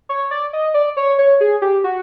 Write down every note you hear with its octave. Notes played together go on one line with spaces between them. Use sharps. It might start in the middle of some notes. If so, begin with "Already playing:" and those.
C#5
D5
D#5
D5
C#5
C#5
G#4
G4
F#4